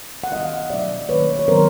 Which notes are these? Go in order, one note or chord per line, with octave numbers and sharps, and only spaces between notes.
F#5
D#3 G3 B3 D#5 F5
B2 F#3 A3 D5 E5
D#3 F#3 A#3 B4 C#5
C#5
D#3 F#3 B3 A#4 C5